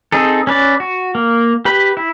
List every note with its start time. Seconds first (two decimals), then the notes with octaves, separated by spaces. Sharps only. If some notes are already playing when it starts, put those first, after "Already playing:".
0.12 C4 D#4 G#4 A4
0.47 C#4 B4 D5
0.80 F#4
1.15 A#3
1.65 G4 B4 B5
1.97 E4